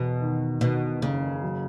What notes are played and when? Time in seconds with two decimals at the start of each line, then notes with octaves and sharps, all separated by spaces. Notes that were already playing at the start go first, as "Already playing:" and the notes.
Already playing: E2 B2
0.21 D#3
0.61 B2 D#3
1.02 F#1 C#3
1.43 F#3